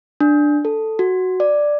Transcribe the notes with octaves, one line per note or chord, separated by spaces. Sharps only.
D4
A4
F#4
D5